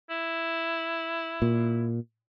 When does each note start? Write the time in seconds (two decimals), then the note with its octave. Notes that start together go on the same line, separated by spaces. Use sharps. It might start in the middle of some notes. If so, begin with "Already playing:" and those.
0.10 E4
1.42 A#2